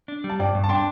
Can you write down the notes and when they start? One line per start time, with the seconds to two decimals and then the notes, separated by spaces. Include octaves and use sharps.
0.08 D4
0.24 G3
0.30 A5
0.39 G2 D5 G5
0.55 G2
0.64 A5
0.69 D4 G5 C6